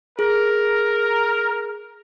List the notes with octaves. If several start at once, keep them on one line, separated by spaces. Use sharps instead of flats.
G#4 A#4